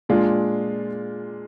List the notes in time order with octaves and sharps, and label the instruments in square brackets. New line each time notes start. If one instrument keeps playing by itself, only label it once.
[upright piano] A#2 G#3 D4 F4